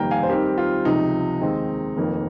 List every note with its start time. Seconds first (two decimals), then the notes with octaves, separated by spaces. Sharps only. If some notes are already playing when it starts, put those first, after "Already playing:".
Already playing: F1 D#2 D#3 G3 A#3 G5 A#5
0.11 F5 G#5
0.23 C5
0.29 D#2 D#3 G3 C4 G4 A#4
0.58 F4
0.85 C#2 C3 F3 D#4
1.41 D#2 D#3 G#3 C4
1.97 F1 F2 D#3 A#3